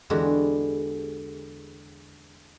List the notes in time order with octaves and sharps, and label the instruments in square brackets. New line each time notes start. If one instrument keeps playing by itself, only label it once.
[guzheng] E2 D3 G#3 F#4 G4